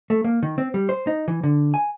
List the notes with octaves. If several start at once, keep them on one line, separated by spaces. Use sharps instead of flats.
A3
A#3
D#3
C4
G3
C5
D#4
E3
D3
G#5